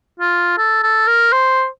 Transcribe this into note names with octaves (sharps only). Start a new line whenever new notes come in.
F4
A4
A4
A#4
C5